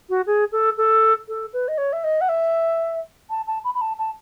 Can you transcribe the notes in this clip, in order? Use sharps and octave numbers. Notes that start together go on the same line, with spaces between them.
F#4
G#4
A4
A4
A4
B4
D#5
C#5
E5
D#5
F#5
E5
A5
A5
B5
B5
A5
A5